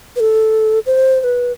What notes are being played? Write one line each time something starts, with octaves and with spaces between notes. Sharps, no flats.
B4
A4
C5
C5
B4